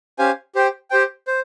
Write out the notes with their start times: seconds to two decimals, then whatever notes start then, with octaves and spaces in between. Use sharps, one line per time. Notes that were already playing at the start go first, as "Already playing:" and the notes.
0.19 C#4 G4 C5 F5 G#5
0.55 G4 C5 G5
0.90 G4 C5 G5
1.27 C5